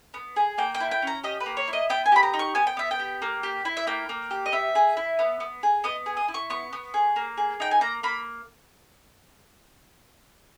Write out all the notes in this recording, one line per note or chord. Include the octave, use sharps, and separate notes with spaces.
B3
G#4
A#3 G5
G5
E4
G5
C#4 A#5
G4 D#5
B4
A#3
C#5
E4
D#5
B3 G5
G#5
G4 B5
A#5
D#4
C#6
B3 G#5
G5
B3 E5
G5
G4
A#3
G4
E4
E5
A#3 G5
A#3
G4
D#5
B3 E5
G#4
E4
B3
B3
G#4
B3 D#5
G#4
D#5
E4
C#6
B3 C#6
B3
G#4
A#3
G#4
D#4 G5
G#5
A#3 A#5
A#3 B5